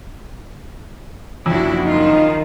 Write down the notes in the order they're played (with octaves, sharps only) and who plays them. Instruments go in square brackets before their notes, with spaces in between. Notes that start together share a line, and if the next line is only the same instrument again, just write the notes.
[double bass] F#1 [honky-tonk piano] F2 [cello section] D4 E4 F#4
[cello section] D#3 F4 [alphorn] D#4